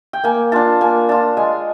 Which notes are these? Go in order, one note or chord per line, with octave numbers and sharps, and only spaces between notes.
G5
A#3 G#5
D4 F4 A5
A#3 G#5
D4 F4 A5
G#3 G#5